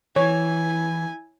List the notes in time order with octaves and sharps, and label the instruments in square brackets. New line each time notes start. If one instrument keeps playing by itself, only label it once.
[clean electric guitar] E3 [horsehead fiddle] E4 G#5 [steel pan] C#5